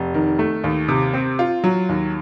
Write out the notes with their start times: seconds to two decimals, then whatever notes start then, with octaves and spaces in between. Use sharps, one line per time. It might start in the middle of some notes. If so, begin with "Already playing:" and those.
Already playing: F1
0.14 D#3
0.39 A3
0.64 D#2
0.88 C3
1.14 C4
1.39 F4
1.64 F#3
1.89 D#2